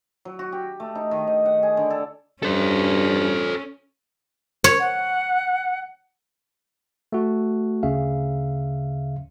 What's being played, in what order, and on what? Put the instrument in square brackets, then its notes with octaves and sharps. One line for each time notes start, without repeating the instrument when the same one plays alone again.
[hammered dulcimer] F#3
F#4
G4
A3
D#4
D#3
D#5
F#5
G#4
D3
A4
[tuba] G2 [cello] C#4 [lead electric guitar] A4 C5
[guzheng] C#5
[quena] F#5
[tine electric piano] A3 F#4
D2 C#3 E5 F5